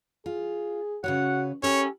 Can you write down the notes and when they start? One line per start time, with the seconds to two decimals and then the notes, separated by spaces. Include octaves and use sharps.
0.26 F4 G#4
1.04 C#3 F#4 B4 C#5 F#5
1.63 C#4 E4 G4 A4 A#4 C#5